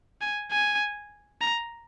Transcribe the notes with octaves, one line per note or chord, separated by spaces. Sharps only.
G#5
G#5
A#5